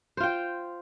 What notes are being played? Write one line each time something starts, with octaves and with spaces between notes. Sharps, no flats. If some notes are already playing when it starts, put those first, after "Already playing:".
F4 C5 G5